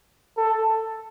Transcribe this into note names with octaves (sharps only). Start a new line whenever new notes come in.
A4